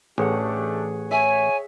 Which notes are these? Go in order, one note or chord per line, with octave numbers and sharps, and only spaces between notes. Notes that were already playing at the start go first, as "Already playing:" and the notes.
A1 A3 D4 G4 G#4 C#5 F#5
C#5 E5 G#5